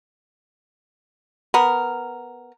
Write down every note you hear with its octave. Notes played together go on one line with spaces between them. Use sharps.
B3 A#4